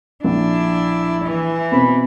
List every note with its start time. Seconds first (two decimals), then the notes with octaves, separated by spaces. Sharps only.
0.24 A#1 D4 E4
1.26 E3
1.72 B2 C4 B5